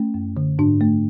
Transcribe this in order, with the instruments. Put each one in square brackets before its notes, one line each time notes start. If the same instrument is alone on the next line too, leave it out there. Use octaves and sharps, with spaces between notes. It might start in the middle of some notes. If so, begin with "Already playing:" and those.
Already playing: [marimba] A3 C#4
F#2
D3
G#2 D4
A3